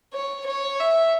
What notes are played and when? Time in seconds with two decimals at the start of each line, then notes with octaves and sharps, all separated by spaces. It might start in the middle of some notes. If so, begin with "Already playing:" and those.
0.13 C#5
0.46 C#5
0.80 E5